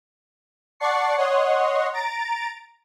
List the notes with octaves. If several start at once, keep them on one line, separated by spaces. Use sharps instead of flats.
D5 F#5 A5 C#6 C7
C#5 D#5 F#5 C6
A#5 A6 D7